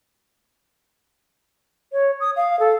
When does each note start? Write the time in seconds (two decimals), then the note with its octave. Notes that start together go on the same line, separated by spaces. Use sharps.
1.93 C#5
2.20 D#6
2.36 F5
2.60 A4